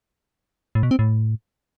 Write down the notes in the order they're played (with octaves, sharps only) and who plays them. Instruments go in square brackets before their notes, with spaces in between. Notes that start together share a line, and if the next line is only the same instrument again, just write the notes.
[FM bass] A2
B2
C4
A2